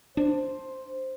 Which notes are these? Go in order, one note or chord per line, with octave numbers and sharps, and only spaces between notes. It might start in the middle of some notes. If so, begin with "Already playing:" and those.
D4 C5